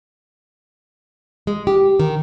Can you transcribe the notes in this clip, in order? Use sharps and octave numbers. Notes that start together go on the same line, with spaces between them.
G#3
G4
D#3